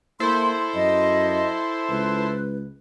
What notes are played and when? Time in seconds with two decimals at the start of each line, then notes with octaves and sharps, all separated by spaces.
0.20 A#3 E4 A4 C5 C6
0.75 F#2 D#5
1.90 C#2 B4